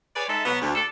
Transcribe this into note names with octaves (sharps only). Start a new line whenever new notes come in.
G#4 B4 C#5 D5
G#3 D#4 A4 E5
B2 F#3 B3
D2
D4 A4